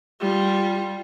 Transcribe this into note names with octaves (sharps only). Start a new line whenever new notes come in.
G3 F4